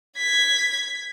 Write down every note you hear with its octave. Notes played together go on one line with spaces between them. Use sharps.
G#6 B6